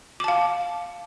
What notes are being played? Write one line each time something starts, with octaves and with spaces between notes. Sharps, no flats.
F5 A5 D6